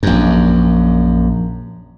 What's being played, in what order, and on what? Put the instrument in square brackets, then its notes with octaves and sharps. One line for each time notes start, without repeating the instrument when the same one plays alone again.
[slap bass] A#1 F#2